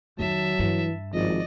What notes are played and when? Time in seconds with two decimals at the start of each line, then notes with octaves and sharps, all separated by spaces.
0.19 F2 D#3 F#3 E5 A5
0.59 G2 E3
1.14 G#1 F3 D5 D#5